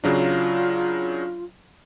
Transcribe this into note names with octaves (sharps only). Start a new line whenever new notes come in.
C#3 F#3 D4 F4